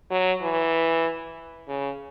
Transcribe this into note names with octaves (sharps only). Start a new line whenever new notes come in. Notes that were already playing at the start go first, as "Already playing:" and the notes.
F#3
E3
C#3